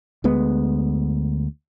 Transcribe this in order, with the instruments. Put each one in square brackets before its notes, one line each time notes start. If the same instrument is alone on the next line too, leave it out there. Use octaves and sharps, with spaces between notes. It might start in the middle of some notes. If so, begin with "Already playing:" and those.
[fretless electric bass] D2 G#3 B3